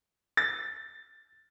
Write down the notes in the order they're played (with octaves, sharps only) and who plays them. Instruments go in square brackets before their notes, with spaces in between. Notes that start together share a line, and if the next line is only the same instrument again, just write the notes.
[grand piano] A6